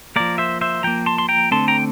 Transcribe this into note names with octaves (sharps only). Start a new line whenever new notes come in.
F3 A#3 A#4 D5
C5 E5
C5 E5
F3 A#3 G5 A#5
A5 C6
C6
G5 A#5
D3 A3 C4 A5 C6
G5 A#5